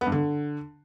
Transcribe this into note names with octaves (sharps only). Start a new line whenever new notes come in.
B3
G2
D3